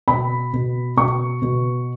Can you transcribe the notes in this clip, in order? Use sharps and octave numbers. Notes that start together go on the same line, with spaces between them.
B2 B5
B2
B2 C#6
B2